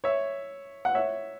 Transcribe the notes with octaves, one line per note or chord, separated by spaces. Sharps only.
C#5 E5
F#5
C#5 E5